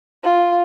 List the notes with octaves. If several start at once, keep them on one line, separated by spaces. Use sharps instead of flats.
F4